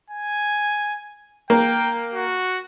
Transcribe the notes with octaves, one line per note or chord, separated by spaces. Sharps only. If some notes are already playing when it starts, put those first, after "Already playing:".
G#5
A#3 G5
F#4